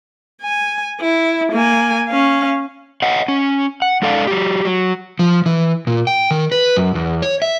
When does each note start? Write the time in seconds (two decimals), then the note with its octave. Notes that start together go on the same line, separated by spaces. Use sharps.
0.41 G#5
1.01 E4
1.52 A#3 G#5
2.08 C#4 F5
3.02 C#5 D#5 F#5
3.28 C#4
3.82 F#5
4.02 G#3 D4 A4 D5 F5
4.27 F#3 G4
4.65 F#3
5.19 F3
5.46 E3
5.87 A#2
6.07 G5
6.31 D#3
6.52 B4
6.76 F#2
6.95 E2
7.22 C#5
7.42 E5